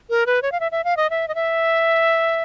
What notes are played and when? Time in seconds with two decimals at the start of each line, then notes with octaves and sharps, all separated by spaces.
0.10 A#4
0.26 B4
0.42 C#5
0.52 F5
0.60 E5
0.72 E5
0.84 F5
0.97 D#5
1.10 E5
1.28 D#5
1.35 E5